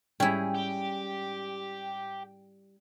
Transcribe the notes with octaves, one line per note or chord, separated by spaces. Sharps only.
G#2 G3 C#4 E4 G#4 G5
G4